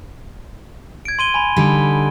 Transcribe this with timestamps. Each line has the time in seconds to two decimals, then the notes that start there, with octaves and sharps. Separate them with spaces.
1.05 G#6 D7
1.19 C6 D#7 G7
1.34 G#5 B5
1.56 D3 G3 D#4